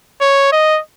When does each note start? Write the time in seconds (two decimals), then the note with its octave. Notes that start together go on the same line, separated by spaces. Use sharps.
0.21 C#5
0.52 D#5